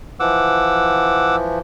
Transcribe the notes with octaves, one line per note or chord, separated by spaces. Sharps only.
E3 F3 F#5 D6 E6